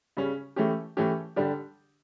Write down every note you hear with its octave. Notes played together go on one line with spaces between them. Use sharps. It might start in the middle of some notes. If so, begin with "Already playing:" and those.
C#3 G3 C#4
E3 A3 C#4 G4
E3 A3 C#4 G4
D3 G3 D4 G4